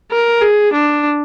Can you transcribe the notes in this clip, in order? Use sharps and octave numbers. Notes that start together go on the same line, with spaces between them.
A#4
G#4
D4